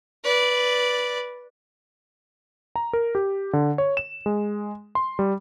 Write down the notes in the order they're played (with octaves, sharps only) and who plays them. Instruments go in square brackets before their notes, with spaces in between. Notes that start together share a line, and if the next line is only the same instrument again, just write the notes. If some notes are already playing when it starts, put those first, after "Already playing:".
[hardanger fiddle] B4 D5
[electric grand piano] A#5
A#4
G4
D3
C#5
E7
G#3
C6
G3